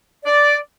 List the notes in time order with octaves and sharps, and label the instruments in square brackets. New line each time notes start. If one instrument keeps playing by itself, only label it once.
[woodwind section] D5